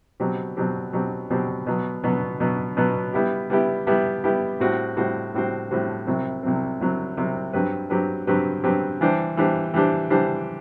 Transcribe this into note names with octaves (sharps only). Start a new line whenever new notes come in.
B2 F#3 C4 G4
B2 F#3 C4 G4
B2 F#3 C4 G4
B2 F#3 C4 G4
B2 F#3 B3
B2 F#3 B3
B2 F#3 B3
B2 F#3 B3
G3 B3 E4 G4
G3 B3 E4 G4
G3 B3 E4 G4
G3 B3 E4 G4
A2 G3 C4 F#4 C5
A2 G3 C4 F#4 C5
A2 G3 C4 F#4 C5
A2 G3 C4 F#4 C5
C2 C3 F#3 C4
C2 C3 F#3 C4
C2 C3 F#3 C4
C2 C3 F#3 C4
G2 F#3 C4 G4 B4
G2 F#3 C4 G4 B4
G2 F#3 C4 G4 B4
G2 F#3 C4 G4 B4
E3 G3 D4 G4 C5
E3 G3 D4 G4 C5
E3 G3 D4 G4 C5
E3 G3 D4 G4 C5